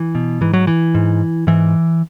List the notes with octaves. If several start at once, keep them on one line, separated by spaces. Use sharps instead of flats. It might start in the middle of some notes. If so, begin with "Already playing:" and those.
Already playing: E3
B2
G#2 E3
F#3
E3
G#2
G#2 E3